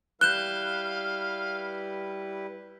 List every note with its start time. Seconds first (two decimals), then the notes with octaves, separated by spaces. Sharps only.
0.21 G3 E4 B4 F5 F#6 G6 E7 G7